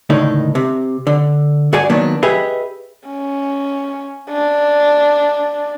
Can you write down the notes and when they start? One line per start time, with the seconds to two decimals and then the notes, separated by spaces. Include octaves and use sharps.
0.10 C#2 A2 D3 D#3 D#4
0.55 C3
1.07 D3
1.73 G2 F#4 G#4 D5 G#5
1.90 D#3 F#3 A#3 B3 D4
2.23 G4 G#4 B4 D#5 E5
3.08 C#4
4.31 D4